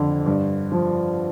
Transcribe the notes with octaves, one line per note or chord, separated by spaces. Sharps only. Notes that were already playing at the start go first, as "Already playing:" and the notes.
Already playing: F2 D3
G2
F3